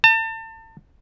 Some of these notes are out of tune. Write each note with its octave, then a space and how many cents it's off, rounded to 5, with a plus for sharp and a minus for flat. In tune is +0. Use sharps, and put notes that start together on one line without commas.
A5 +35